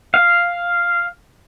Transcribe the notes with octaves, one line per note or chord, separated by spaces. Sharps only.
F5